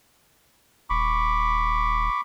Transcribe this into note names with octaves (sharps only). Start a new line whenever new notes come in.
D#1 B5 C#6 D6